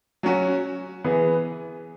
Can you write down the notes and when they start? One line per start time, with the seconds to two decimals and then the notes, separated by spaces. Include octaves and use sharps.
0.23 F#3 C#4 F#4
1.04 E3 B3 G#4 B4